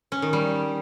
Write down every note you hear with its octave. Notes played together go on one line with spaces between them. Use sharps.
C#4
D#3
G3